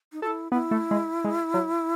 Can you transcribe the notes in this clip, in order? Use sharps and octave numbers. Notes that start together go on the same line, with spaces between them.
D#4
F#4 A4
E4
B3 E4
A3
G#3
G#3
F#3